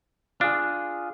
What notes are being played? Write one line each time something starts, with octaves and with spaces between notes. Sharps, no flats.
D4 F4 G#4